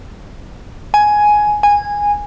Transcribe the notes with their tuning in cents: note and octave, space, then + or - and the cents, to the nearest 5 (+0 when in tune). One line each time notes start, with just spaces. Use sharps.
G#5 +10
G#5 -15